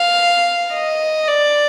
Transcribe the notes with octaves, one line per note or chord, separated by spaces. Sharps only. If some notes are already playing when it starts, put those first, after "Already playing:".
Already playing: F5
D#5
D5